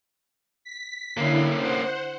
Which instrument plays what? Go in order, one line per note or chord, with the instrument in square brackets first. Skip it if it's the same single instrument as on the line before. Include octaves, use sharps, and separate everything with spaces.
[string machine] B6
[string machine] D3 E4 [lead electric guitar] A#3 C#4
[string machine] C5 F#5